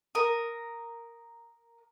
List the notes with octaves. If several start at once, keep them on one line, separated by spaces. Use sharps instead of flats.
A#4 D#6